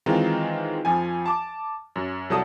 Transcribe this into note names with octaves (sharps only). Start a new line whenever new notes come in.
D#3 E3 G#3 C4 D#4 F4
F2 F3 G#5
A5 D6
F#2
C2 F#3 A4 D5 A5 D#6